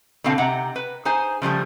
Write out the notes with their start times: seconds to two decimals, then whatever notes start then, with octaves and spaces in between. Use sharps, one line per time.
0.24 B2 D3 C4 F5 A5
0.38 C3 D#4 F#5 A#5
0.76 B4
1.05 D#4 G#4 C5 G#5
1.42 C#3 F3 G3 A3